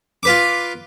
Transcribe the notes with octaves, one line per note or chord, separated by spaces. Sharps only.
F4 B4 D6